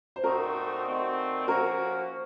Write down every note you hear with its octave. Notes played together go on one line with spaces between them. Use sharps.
C5
A#2 A3 C4 D#4 F#4 A#4
A#2 A3 C4 D#4 F#4
F3 A#3 C#4 F#4 A#4
F3